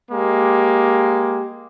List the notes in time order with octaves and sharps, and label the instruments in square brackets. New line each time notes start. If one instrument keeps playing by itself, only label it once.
[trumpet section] G#3 A#3 G4